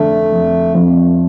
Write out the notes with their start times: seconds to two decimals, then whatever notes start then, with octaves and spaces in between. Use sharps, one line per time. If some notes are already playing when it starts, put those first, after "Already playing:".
Already playing: F2 D3 A3
0.32 F2
0.75 F2